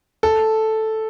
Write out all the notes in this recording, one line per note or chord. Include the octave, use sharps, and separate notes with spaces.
A4